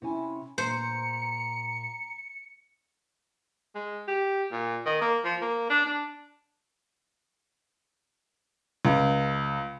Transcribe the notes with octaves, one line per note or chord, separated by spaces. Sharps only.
C3 C#4 E4 G#5
A#2 C5 A#5 C#7
G#3
G4
A#2
D#3
A#3
F3
A#3
D4
D4
C#2